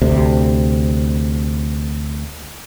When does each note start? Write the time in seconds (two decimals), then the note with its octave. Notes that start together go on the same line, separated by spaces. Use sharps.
0.02 D2 C3